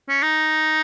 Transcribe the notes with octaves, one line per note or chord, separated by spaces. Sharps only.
C#4
D#4